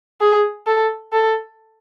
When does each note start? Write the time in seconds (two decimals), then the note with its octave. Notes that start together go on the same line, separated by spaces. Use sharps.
0.21 G#4
0.66 A4
1.13 A4